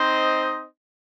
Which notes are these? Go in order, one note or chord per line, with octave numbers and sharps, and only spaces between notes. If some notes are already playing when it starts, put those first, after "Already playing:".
Already playing: C4 D#4 C5 D#5